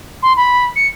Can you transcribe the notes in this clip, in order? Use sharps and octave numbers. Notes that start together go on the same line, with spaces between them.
C6
B5
C#7